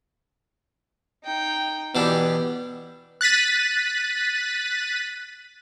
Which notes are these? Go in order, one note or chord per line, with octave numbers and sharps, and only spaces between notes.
D#4 G5
B2 E3 B3 D4 G4
F#6 A6 B6 D#7